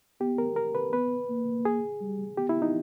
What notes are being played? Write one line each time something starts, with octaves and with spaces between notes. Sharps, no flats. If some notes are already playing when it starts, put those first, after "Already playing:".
B3 G4
A#4
A#4
B4
B3 B4
A#3
G#4
G3
B3 G4
E4
D#4